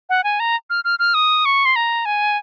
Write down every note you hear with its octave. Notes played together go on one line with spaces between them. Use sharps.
F#5
G#5
A#5
F6
F6
F6
D#6
C#6
C6
A#5
G#5